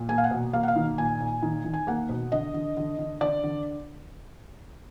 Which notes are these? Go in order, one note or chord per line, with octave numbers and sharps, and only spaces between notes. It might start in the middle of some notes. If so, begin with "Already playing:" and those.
Already playing: A#2
A#3 G#5
F5
F#5
B2
A#3 F5
F#5
F5
D#3
A#2 G#5
A#2
D#3
D#3
G#5
A#3 F#5
B2
D3 D#5
D3
D3
D3
D3 D5
D3